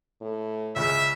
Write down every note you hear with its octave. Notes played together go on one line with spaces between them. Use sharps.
A2
C#2 C#3 E5